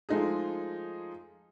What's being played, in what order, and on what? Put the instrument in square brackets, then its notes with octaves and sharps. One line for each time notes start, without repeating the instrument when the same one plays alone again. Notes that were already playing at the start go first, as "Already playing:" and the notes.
[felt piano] F3 G#3 A3 D#4 F4 G#4